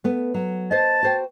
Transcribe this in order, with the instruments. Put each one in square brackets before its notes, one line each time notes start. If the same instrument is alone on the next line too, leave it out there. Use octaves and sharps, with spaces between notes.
[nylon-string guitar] A3 B3
F#3
[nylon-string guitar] C5 D#5 [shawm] A5
[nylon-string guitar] F#4 C5 G5